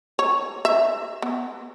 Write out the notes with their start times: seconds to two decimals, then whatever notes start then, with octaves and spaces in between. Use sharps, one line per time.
0.19 C#5
0.65 E5
1.22 B3